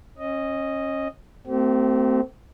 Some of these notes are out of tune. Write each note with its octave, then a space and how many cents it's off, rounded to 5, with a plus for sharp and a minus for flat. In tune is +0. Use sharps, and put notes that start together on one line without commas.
C#4 -30 D#5 +0
A3 +35 C4 -15 G4 -45